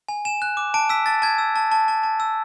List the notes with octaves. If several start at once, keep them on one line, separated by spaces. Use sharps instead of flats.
G#5
G#5 E7
F#6
D6
A5 D7
E6 B6
A5 A6
A5 G#6
E6
A5
A5
A5
A5
E6